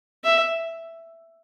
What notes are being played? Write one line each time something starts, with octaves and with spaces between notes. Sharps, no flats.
E5